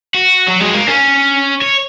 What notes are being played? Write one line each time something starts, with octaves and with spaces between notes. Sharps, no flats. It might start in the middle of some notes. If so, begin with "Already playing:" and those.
F#4
F#3
G#3
A#3
C#4
C#5